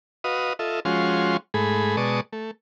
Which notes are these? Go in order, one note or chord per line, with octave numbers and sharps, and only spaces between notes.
F#4 B4 D#5 F5 D#6
F4 A4 D#5 E5
F3 G#3 C#4 F4 F#4 C6
G#2 A3 G#4 B5
B2 G#3 D5 A5 C#6 D#6
A3